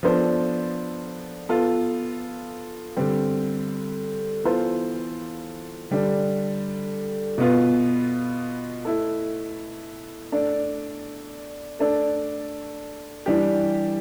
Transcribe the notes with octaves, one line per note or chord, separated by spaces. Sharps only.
F3 B3 D4 A4 C5
B3 F4 A4
D3 G3 C4
E3 B3 F4 A4 C5
D3 G3 D4
B2 B3 F4
A3 E4 A4
A3 D4 A4 D5
A3 D4 A4 D5
E3 G3 D4 G4